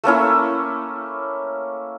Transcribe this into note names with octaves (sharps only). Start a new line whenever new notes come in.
A3 A#3 C#4 E4